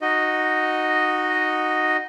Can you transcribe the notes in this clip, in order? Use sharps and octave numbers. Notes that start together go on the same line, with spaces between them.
D#4 F#4 D#5